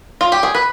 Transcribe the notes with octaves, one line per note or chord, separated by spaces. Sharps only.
F4
G4
G#4
B4